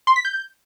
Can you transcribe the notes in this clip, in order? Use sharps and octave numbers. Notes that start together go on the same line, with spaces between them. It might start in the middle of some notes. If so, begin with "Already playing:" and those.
C6
B6
G6